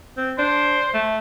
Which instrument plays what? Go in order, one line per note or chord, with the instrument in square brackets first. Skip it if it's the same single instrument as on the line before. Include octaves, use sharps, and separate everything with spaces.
[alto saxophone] C4
[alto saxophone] D4 [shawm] C5
[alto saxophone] A3